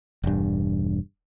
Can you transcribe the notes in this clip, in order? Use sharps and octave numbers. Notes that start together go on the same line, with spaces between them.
E1 G2